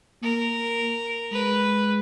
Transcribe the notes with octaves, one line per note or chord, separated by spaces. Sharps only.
A#3 A#4
G#3 B4